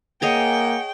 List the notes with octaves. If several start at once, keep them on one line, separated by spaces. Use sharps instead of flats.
A#3 G#4 C#5 D#5 F#5 G5